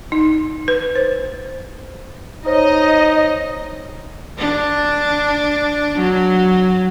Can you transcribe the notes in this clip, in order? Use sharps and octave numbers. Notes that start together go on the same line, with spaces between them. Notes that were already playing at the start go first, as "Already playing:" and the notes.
D#4
B4
C5
D#4 C5 C#5 D#5
D4
F#3